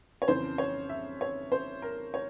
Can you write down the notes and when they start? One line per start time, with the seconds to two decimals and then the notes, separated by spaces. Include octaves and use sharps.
0.22 C#5
0.28 F2 C#3 E3 C5
0.58 C#5
0.89 E5
1.21 C#5
1.52 C5
1.82 A#4
2.14 C#5